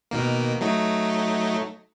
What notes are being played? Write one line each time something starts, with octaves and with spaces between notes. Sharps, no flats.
B2 D#3 A#3
F#3 A3 D#4